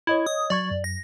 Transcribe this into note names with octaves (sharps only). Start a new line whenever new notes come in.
E4 C#5 D#5 G#6
D#6
F#3 D5 C#6 G#6
F#2
A#6